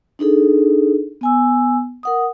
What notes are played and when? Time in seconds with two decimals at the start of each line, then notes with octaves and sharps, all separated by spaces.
0.19 D4 D#4 G#4 A4
1.21 B3 G#5 E6
2.03 A#4 F#5 D#6